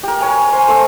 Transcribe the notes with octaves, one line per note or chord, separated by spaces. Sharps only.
G4 A#4
A#4 C#5 G#5
C5 G#5
A3 C5 E6